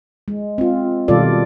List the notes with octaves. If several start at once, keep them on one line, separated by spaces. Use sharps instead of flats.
G#3
C4 F4
B2 D#3 G3 F4 A4 D5